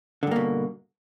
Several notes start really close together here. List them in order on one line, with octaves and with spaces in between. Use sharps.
D3 G2 A#3 B2